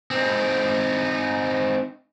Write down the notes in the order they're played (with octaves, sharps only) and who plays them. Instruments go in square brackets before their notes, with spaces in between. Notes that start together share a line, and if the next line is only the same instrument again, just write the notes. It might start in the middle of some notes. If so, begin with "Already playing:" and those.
[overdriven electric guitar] C4 D#4